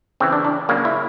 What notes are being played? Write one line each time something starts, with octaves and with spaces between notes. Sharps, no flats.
C#3 E3 C4
D4
D4
C#3 F#3 A#3
E4